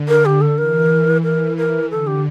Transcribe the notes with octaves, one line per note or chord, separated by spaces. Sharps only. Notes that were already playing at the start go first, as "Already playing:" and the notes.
Already playing: D3
A#4
G4
A4
E3 A#4
E3 A#4
A#4
D3 A4
G4